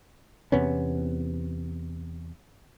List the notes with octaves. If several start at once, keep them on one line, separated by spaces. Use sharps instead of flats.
E2 C3 B3 C#4